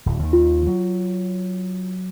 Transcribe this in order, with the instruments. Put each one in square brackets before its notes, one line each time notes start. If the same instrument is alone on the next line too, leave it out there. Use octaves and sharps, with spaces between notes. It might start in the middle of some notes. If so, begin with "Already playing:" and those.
[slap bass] D1
D#2 D#3
[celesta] F4
[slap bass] F#3